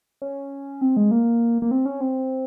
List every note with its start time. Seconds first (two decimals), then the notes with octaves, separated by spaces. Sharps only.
0.22 C#4
0.81 C4
0.97 G#3
1.11 A#3
1.62 A#3
1.71 C4
1.86 C#4
2.01 C4